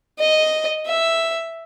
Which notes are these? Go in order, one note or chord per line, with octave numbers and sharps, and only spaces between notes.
D#5
E5